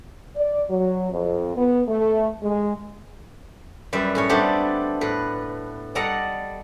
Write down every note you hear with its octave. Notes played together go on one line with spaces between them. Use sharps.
D5
F#3
F2
B3
A3
G#3
F#2 G3 B4 E5
A2 C#4 C#5
G3 A3 B3 C4 D4 G4
A2 B4
G3 A4 D5 D#5 F#5 A#5